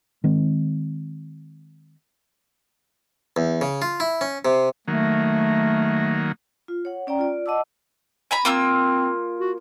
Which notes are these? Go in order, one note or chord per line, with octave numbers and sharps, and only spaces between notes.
D#3 G#3 C4
E2
C#3
F4
E4
C#4
C3
D#3 F#3 A3 A#3
F4
C#5 F#5
C#4 D5 G5 A#5
F4 D5
D#5 F#5 A5 D6 E6
G#5 A#5 B5
A#3 C4 F4 E6
F#4